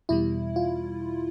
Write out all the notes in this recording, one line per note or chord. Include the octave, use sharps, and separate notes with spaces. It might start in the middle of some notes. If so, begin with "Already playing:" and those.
E2 B2 G3 E4
F4